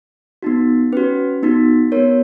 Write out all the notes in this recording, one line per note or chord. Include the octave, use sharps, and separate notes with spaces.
B3 D#4 F#4
C#4 F#4 B4
B3 D#4 F#4
B3 F#4 A#4 C#5